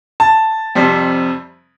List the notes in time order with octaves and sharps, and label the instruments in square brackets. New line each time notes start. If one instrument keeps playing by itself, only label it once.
[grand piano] A5
F2 C3 G3